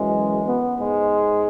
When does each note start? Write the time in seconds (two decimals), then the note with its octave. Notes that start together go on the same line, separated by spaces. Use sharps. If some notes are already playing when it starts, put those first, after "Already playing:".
Already playing: F#2 E3 G#3
0.47 B3
0.77 G#2 G#3